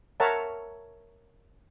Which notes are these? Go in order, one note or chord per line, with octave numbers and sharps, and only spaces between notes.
A#4 C#5 E5 F#5 A5 A#5